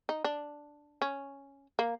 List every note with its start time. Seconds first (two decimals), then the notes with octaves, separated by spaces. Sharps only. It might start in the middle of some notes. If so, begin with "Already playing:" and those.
0.09 D#4
0.24 D4
1.02 C#4
1.79 A#3